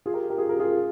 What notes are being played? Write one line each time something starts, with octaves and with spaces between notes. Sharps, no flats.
F4 G#4
G4 A#4
G4 A#4
F4 G#4
G4 A#4
F4 G#4